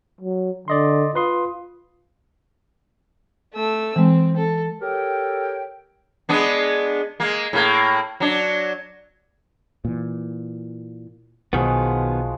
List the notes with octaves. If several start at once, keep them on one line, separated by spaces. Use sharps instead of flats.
F#3
D3 D5 D#5 C6
F4 B4 C6 D#6
A3 E6
E3 G#3 C4
A4
G4 A4 A#4 C#5 G5
G#3 B3 D4
G#3 A#3
A2 A#3
F#3 D4
A#2 E3
B1 B2 D#3 F3 G#3 B3 F#4